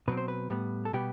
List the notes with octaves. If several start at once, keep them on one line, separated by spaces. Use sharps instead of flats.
B2 F#3 C4 B4
C5
B4
A2 G3 B3
A4
B2 G3 B3 G4